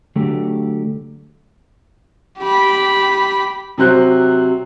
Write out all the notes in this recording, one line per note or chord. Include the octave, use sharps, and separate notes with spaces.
D3 F#3 A3 G4
G4 B5
C3 F#3 C5 F#6